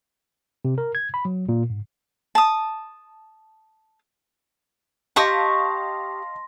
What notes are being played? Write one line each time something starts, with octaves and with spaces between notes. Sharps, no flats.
C3
A#4
G#6
B5
F#3
A#2
G#2
A5 D#6
G4 D#5 F5 A5 C6 C#6 D#6 A#6